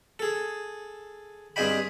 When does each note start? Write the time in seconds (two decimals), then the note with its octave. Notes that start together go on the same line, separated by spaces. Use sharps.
0.19 G#4 A4
1.56 G2 C4 G#4 D#5 G5 B5